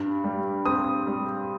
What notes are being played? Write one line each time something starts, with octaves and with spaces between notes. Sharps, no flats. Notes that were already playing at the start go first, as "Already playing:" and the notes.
Already playing: G2
G3
C4 D#6
G3